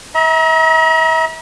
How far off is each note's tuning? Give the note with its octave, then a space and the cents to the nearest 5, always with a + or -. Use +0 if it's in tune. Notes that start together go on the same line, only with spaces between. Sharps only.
E5 -40 A#5 +35